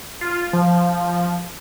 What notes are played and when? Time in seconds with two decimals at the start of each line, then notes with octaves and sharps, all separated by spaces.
0.21 F4
0.53 F3